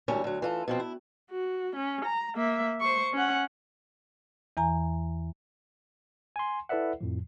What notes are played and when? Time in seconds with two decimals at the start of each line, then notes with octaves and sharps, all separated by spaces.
0.08 D2 G#2 G3 C#4 E4 A#4
0.24 D2 F#3
0.42 E3 F4 A4
0.68 B2 F3 C4
0.80 E4
1.31 F#4
1.76 C#4
2.05 A#5
2.36 A#3 E5
2.80 C5 C#6
3.13 C#4 F#5
4.57 E2 E3 G#5 A#5
6.36 G#5 C6
6.69 E4 A4 B4 D5 E5 F#5
7.01 F2 A2 F3